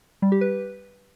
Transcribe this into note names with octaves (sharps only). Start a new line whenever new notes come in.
G3
G4
B4